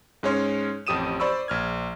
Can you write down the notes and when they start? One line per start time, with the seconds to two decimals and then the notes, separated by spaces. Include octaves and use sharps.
0.23 G#2 G#3 C#4 C#5 C6
0.87 A1 F2 G4 D#6 D#7 E7
1.20 C5 D5 B5 C#6 E6
1.48 A#1 F6 G#6